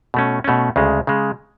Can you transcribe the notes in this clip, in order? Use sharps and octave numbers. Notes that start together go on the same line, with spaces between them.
B2 A3 C#4
B2 A3 C#4
D2 C#3 G#3
C#3 G#3